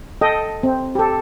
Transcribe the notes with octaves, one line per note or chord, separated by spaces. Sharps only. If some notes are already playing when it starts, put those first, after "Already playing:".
A4 D#5 G5
C4
G4 A4